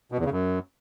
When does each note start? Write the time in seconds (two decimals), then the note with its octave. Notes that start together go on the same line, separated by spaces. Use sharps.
0.12 B2
0.18 E2
0.25 C#3
0.32 F#2